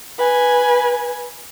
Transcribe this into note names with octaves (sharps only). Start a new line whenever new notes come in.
B4 G#5